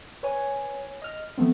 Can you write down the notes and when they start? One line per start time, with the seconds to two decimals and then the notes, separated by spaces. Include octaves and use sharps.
0.23 B4 C#5 G#5
1.02 D#5 F6
1.38 F3 A3 B3 C4